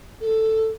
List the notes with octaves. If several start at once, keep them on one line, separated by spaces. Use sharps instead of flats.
A4